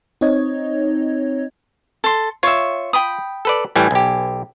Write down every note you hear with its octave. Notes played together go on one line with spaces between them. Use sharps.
C4 D#4 C#5 D#5 G#6
A4 C6
F4 C#5 E5
G5 B5 D#6
A4 B4 D5
A2 E3 G3 G#5
B1 G4